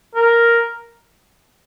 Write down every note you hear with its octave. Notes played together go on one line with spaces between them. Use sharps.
A#4